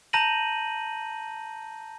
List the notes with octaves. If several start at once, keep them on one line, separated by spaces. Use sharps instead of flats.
A5 A#5 G6 A#6 D#7 F#7